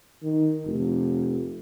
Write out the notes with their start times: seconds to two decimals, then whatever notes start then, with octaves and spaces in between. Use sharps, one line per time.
0.23 D#3
0.65 F1